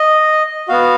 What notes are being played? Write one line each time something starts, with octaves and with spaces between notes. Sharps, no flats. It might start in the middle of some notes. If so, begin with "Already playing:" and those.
Already playing: D#5
B3 F#4 F5